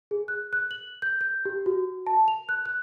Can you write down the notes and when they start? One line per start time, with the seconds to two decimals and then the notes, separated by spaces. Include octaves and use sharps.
0.11 G#4
0.28 F#6
0.53 F#6
0.71 F#7
1.02 G6
1.21 G6
1.45 G4
1.66 F#4
2.06 A5
2.28 F7
2.49 F#6
2.66 F#6